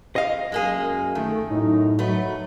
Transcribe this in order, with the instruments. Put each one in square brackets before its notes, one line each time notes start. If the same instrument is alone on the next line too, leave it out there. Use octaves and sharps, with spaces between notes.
[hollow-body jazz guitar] D#5 F5
[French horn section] F#2 [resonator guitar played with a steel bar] G#3 A#3 G#4
[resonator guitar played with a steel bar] D#3 [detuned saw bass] A3
[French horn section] F#2 D#4 [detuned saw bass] A2
[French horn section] F#3 [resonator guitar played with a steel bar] A3 B4